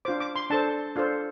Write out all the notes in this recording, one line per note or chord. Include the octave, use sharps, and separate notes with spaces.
D4 F4 C5 D6
D6
C6
D4 A4 C5 A5
D4 F4 A4 C5